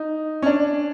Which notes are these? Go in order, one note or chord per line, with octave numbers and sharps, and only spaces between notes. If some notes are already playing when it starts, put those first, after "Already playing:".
Already playing: D#4
C#4
D4